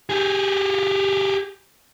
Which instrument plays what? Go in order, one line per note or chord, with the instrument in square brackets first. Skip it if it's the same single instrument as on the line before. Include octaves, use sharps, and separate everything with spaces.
[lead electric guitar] G4 G#4